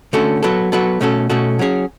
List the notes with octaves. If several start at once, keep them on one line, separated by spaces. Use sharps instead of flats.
D3 A3 C#4 F#4 A4
F#3 B3 F#4 A4
F#3 B3 F#4 A4
B2 A3 C#4 F#4 A4
B2 A3 C#4 F#4 A4
F#3 C#4 G#4